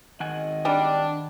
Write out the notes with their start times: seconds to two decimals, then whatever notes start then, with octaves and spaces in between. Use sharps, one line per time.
0.20 G#1 D#3 D#5 F#5 G#5
0.65 G3 D4